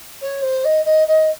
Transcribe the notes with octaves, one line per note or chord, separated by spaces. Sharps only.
C#5
C5
D#5
D#5
D#5